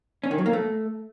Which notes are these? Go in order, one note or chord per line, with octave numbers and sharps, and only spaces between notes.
C#4
D#3
F#3
A#3
A3